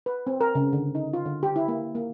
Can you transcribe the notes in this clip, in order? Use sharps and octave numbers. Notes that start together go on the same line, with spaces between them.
B4
C4
A#4
C#3
D3
D#4
F4
D3
G4
E4
A#3
A#3